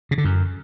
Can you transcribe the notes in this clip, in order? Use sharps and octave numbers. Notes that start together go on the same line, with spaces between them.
C#3
D3
F#2